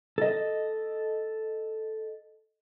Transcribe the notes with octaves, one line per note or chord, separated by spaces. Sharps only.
A4 D#5